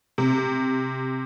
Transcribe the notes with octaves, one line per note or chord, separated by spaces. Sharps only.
C3